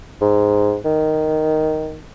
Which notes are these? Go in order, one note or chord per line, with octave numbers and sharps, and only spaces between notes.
G#2
D#3